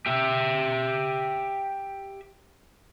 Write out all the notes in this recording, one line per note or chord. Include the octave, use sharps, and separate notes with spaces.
G4 E5